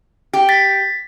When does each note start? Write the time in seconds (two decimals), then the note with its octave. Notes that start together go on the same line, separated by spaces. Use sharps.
0.33 G4
0.49 A6 B6